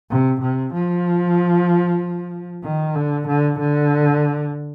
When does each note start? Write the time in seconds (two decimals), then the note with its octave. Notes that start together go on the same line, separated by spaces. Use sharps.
0.10 C3
0.41 C3
0.73 F3
2.63 D#3
2.95 D3
3.27 D3
3.59 D3